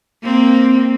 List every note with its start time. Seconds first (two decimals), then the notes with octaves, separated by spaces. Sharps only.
0.23 A#3 C4